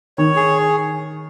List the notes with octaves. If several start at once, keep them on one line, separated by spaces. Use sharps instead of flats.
D#3 C#5
G#4